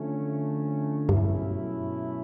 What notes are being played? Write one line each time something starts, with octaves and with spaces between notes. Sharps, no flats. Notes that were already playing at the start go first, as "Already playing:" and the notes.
Already playing: D3 F3 A3 C#4
G2 B2 F#3 A3 C#4 E4